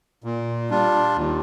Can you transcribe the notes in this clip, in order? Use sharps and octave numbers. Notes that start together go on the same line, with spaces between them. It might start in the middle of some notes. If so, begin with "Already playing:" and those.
A#2
G3 D4 F4
D#2